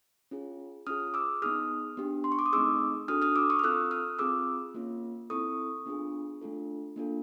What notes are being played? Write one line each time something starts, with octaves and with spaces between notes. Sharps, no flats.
C#4 F4 G#4
C#4 F4 G#4 D#6 F6
D6 E6
B3 D#4 G#4 D#6 F6
B3 D4 G4
C6
C#6
D6
D#6
A3 C4 D#4 G#4 D6 E6
D4 F#4 A4 D#6 F6
D#6 F6
D6 E6
C#6 D#6
F6
C4 F4 A4 E6 F#6
D#6 F6
C4 F4 G#4 D6 E6
A#3 C#4 F4
C4 E4 A4 C#6 D#6
B3 D4 F4 G#4
A3 D4 F4 A4
A#3 D4 F4 A4